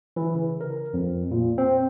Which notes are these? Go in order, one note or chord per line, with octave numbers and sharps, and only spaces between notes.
E3
C#3
A#4
F2
A#2
C4